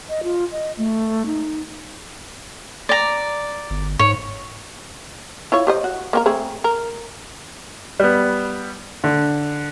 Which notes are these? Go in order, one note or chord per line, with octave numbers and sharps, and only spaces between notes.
D#5
F4
D#5
A3
D#4
D5 A#5
G1
G#2 C#5
E4 F4 C#5
G4 C5 D#5
F#4
A#3 C4 A#4
A3 C4 G#4
A#4
G3 B3
D3